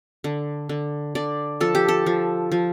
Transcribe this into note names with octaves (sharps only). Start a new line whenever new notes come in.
D3
D3
D3 D5
F3 A4
G4
A4
F3
F3